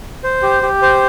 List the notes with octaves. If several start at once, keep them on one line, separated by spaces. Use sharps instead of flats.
C5
G4
G4
C5